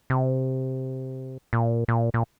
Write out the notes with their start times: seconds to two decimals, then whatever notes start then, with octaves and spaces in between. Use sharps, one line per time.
0.10 C3
1.53 A#2
1.88 A#2
2.14 A#2